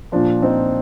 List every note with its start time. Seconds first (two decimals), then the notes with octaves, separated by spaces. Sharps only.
0.12 A#2 F3 D4 F4
0.42 C4 D#4